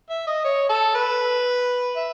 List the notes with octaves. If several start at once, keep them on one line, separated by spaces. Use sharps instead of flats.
E5
D#5
C#5
A4
B4
E5